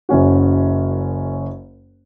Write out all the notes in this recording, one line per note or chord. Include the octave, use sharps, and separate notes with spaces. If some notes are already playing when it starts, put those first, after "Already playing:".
F#1 F#2 C#4 F#4